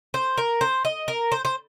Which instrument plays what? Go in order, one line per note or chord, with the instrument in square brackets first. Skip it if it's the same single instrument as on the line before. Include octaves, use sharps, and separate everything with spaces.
[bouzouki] C5
A#4
C5
D#5
A#4
C5
C5